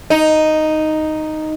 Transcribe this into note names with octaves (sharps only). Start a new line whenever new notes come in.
D#4